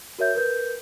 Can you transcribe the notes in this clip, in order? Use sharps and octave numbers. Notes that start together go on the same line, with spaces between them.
F#4 A#4 C#5 E5 G6
A#4 B4 G6